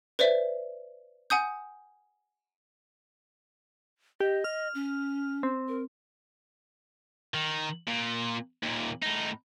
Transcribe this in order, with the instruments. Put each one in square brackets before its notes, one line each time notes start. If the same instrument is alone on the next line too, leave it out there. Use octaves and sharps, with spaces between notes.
[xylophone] B4 C5 D5 E5
F#5 G#5 D#6 G6
[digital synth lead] G4 [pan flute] D#5
[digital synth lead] F6
[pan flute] C#4
[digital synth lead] C4
[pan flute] A#4
[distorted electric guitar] D#3
A#2
D#2 A#2
A2 D#4